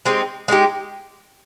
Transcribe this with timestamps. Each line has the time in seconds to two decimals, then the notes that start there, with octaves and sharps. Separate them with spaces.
0.06 G#3 C4 D#4 G4
0.48 G#3 C4 D#4 G4